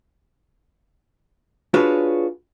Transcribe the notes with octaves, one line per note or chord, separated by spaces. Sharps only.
D4 F4 F#4 G#4 B4 C#5